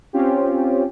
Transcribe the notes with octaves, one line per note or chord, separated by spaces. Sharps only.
C4 C#4 F4 G4